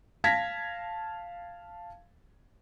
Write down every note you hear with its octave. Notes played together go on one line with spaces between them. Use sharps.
F5 A5 G#6 A#6 B6